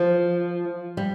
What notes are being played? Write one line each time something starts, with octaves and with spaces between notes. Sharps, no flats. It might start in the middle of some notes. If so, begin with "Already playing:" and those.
Already playing: F3
G3